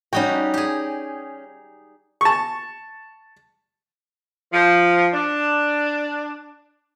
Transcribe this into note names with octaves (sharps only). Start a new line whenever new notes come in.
G3 C#4 D#4 F#4 G5
G4 G#4
A5 C#6
F3
D4